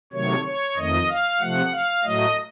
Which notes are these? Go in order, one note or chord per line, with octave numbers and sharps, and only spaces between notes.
C3 D#3 F#3 A3 C#5
C#5
F2 D#3 A3 D#5
F5
C3 F3 A3 F#5
F5
A2 F#3 A3 D#5